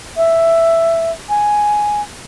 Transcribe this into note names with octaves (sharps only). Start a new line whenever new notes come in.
E5
G#5